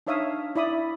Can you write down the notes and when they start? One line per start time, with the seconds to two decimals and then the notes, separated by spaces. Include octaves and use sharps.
0.07 D4 D#4 C#5 E5 F5 D#6
0.56 E4 D5 B5 D#6